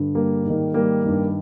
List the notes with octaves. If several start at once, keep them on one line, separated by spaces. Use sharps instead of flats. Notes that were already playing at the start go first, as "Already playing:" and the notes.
Already playing: G2 D3
G3 A#3
G#2
D#3
G3 A#3
G2 D#3